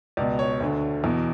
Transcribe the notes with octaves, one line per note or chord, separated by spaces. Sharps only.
C#2 B2 D5
C#5
D2 D3
E2 B2